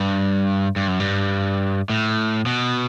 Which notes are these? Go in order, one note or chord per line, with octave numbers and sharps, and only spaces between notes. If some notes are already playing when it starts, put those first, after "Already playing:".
Already playing: G2
G2
F#2
G2
A2
B2